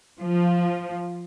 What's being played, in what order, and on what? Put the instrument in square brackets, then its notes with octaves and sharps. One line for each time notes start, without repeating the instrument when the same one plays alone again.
[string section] F3